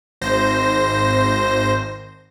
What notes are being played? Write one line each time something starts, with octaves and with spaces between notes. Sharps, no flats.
G#1 C5 A#6